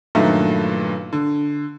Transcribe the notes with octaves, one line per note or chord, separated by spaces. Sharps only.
G2 A#2 D#3 F#3 A3
D3